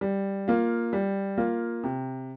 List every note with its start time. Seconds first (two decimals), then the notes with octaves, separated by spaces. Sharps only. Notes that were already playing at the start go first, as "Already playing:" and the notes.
0.01 G3
0.48 A#3 F4
0.93 G3
1.38 A#3 F4
1.83 C3